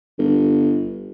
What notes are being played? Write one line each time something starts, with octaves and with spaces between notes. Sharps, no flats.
G1